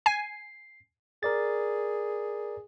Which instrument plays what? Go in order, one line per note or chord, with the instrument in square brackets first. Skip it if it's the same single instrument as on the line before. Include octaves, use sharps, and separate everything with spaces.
[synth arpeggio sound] G#5 [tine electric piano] C7
[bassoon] G#4 [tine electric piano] A#4 D5 A6